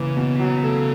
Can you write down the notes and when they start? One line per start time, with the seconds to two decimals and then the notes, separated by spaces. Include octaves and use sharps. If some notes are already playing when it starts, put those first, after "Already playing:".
Already playing: C#3 E3 A#3
0.17 B2
0.39 F#3
0.63 A3